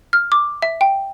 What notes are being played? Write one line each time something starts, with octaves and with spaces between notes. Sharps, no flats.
F6
D6
E5
G5